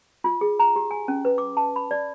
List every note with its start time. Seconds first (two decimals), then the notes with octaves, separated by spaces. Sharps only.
0.24 F4
0.41 G#4
0.59 A#5
0.76 G4
0.91 G#5
1.08 C#4
1.25 B4
1.38 D6
1.57 A5
1.76 B5
1.91 D5